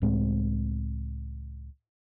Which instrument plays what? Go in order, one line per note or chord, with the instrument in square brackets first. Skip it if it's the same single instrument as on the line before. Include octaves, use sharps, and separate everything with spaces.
[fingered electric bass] C#2 A2 G#3 C4